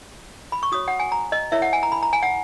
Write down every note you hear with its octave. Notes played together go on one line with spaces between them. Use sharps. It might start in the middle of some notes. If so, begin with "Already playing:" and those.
B5
C#6
F#4 C#5 D#6
F#5
G#5
A#5
D#5
E4 A#4 C#5 E5
F#5
G#5
A#5
B5
A#5
G#5
F#5